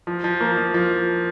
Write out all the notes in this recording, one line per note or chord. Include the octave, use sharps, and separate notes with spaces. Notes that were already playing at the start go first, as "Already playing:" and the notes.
F3
F3
A#3
F3
F3